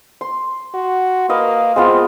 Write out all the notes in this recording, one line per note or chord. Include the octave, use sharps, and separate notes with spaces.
C6
F#4
A#3 B4 D#5 F5
G#3 B3 C4 F4